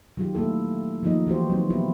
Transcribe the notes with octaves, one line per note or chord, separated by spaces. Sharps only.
D#3 F#3 F4 G4
A3 A#3 E4 A4
D#3 F3 A#3 D#4 D#5
E3 F#4 G4 C5
F#3 C4 D#4 C5
B3 E4 F4 G4